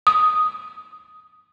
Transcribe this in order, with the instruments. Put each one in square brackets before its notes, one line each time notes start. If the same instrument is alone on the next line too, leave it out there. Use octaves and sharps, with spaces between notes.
[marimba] D#6